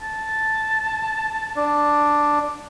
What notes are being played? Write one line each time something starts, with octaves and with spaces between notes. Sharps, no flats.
A5
D4